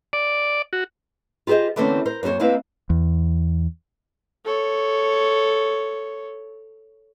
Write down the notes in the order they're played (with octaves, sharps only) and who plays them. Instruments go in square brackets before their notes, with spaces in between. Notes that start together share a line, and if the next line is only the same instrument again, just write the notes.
[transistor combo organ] D5
F#4
[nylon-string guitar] F4 G4 G#4 C5 D#5
D3 E3 A3 A#3 C4 C#4
A#4 C5
F#2 A#3 F4 C5 C#5
G#3 A#3 C4 E4 B4 F5
[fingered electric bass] E2
[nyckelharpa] A4 C#5